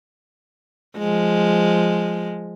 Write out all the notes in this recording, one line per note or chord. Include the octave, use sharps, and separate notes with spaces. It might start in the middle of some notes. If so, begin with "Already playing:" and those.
F3 G#3